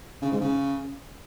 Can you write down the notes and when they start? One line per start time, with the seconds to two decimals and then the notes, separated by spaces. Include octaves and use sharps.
0.22 C#3
0.31 G#2
0.41 C#3